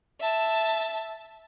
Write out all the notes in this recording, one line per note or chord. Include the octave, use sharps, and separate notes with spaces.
E5 A5